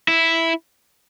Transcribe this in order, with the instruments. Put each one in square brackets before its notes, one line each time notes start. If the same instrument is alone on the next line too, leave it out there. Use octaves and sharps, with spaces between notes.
[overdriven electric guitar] E4